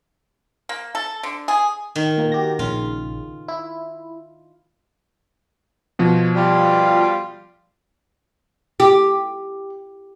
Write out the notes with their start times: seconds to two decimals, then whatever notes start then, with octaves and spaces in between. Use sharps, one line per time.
0.69 A#3
0.95 A4
1.23 D3
1.48 G#4
1.95 D#3
2.17 A#2 A#3
2.32 F#4 G4 A#6
2.59 A#1 C#3 F4
3.48 E4
5.99 B2 F3
6.35 G3 F4
8.80 G4